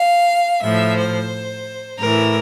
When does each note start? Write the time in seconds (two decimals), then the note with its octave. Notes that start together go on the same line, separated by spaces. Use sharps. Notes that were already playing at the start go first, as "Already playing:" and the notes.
Already playing: F5
0.62 A2 F3 E5
0.97 C5
2.00 A2 E3 A#4